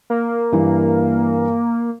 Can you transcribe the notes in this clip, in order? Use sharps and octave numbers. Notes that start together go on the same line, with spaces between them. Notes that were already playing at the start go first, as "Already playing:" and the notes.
A#3
G2 E3